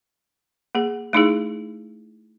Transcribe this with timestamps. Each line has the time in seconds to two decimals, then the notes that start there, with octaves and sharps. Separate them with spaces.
0.75 A#3 G#4
1.13 A3 D#4 E4 G#4